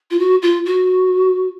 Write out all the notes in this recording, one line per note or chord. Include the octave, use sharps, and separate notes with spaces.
F4
F#4
F4
F#4